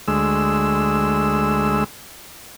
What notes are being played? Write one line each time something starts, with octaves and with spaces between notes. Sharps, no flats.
D2 G#3 E6